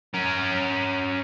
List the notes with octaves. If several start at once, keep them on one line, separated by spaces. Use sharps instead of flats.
C#4 A#4